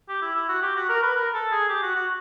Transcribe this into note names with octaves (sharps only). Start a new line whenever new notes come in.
G4
E4
E4
F#4
G4
F#4
A#4
B4
A#4
A4
G#4
G4
F#4
F#4